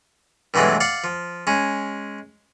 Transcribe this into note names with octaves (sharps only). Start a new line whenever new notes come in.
G2 B2 E3 F#3 G#3 A3
D5 F5 F#5
F3
G#3 C#4